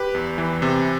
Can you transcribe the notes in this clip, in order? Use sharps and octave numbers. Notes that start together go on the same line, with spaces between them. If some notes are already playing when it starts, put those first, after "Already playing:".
Already playing: G4 B4
E2
E3
C3